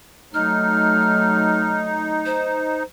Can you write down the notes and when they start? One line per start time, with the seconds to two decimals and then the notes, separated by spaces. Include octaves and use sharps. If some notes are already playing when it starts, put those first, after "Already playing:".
0.34 F#3 A3 D#4 F6
2.26 C5